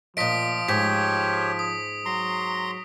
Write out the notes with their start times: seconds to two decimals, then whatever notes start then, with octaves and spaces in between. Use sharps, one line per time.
0.17 A#2 F3 D#5 D#6 B6 D7
0.68 G#2 G4 C#5 B6
1.59 D#6
2.06 F#3 A#5 C6